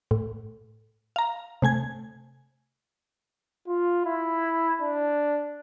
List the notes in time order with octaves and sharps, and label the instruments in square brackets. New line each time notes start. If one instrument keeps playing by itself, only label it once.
[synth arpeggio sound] A2
F5 A#5
C3 A3 G#5 G#6
[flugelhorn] F4
E4
D4